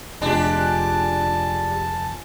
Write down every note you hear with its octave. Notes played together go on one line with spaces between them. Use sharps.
F1 G#3 D4 F4 G4 A5